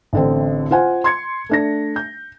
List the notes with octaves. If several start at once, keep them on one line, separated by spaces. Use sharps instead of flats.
A1 D3 C4
F4 C5 F#5 G#5
C6 G#6 C#7
A3 D4 A#6
G6